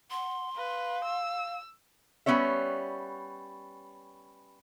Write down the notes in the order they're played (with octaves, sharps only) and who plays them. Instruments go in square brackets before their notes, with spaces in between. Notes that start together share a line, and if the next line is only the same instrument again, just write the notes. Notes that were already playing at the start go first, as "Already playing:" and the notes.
[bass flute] F#5 [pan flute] C6
[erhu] B4 [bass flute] F5
[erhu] E6
[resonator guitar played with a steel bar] G3 B3 C#4 C#5 E5